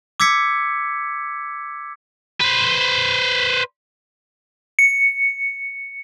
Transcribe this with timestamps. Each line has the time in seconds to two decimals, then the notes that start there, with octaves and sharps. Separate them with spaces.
0.20 D6 E6 G#6 B6 C#7
2.41 B4 C5
4.79 C#7